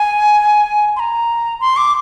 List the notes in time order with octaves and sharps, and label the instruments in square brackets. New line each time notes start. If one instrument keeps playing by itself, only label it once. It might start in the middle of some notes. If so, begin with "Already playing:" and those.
Already playing: [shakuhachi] G#5
C6
A#5
C6
D6